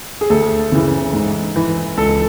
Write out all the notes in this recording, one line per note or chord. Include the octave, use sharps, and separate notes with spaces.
G#4
D2 A4
C#3 E3
G#2
E3
C#2 A4